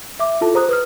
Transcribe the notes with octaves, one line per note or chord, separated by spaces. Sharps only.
E5 D6
E4 F4 A4 A5
G#4 C5 A#5 D#6 F#6
B4 D#6 F6